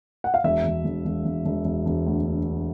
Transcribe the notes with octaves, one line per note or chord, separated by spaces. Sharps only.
F#5
F5
E1 E5
E1
E1
E1
E1
E1
E1
E1
D2